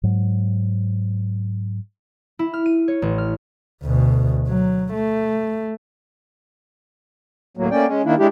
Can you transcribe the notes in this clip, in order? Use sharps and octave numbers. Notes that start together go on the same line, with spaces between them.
G#2 F#3
E4
F6
D#7
C#5
A1
F6
D2 B2
F#3
A3
D2 A2 F#3 A#3
A3 A#3 C#4 D5 G5
G#3 C#4
D#3 A#3 D4 E4
G#3 D4 E4 G4